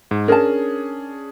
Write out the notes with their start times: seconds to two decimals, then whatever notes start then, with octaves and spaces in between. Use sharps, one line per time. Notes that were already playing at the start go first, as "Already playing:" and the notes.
0.11 G#2
0.28 C#4 D4 G#4 A#4 A5